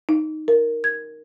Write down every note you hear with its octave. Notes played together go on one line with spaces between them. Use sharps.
D#4
A#4
G#6